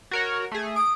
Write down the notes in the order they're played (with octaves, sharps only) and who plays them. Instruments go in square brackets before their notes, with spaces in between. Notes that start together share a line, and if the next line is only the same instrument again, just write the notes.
[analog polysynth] F#4 A#4 C#5
A3 G#4
[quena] D#6 [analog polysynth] D7